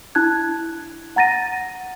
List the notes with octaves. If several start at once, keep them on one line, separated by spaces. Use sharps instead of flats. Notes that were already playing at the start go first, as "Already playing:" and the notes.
D4 E4 A5 F#6 G#6
F#5 A#5 A6 A#6 D#7